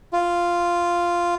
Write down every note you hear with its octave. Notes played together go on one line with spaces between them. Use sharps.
F4